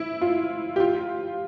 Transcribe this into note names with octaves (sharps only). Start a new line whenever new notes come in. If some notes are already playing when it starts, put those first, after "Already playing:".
Already playing: E4
F4
G4
F4